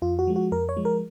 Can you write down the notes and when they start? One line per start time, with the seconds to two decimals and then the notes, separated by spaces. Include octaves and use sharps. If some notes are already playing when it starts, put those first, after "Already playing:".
0.02 F2 F4
0.19 F#4
0.27 F3 G#3
0.36 F#4
0.52 F2 A#4
0.69 C#5
0.77 F3 G#3
0.85 A#4